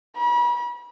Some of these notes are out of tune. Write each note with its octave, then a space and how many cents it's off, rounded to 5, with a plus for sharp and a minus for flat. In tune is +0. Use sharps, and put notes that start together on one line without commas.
B5 -40